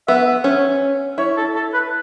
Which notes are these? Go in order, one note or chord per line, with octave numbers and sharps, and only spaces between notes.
B3 E5
E5
C#4
E4 C#5
A4
A4
B4